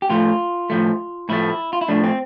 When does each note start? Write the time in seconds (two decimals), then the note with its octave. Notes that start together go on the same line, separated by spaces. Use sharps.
0.02 G4
0.10 A2 F3 A3 F4
0.70 A2 F3 A3
1.29 A2 F3 A3 E4
1.73 F4
1.81 E4
1.88 A2 F3 A3 D4
2.04 C4